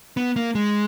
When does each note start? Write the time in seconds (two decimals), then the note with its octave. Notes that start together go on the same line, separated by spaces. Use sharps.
0.17 B3
0.36 A#3
0.55 G#3